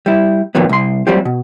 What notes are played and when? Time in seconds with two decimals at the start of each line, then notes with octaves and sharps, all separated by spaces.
0.06 G3 E4
0.55 F2 A#2 D#3 F#3 B3
0.69 C2 C6
1.07 F#3 G3 C4 F4 G4
1.25 B2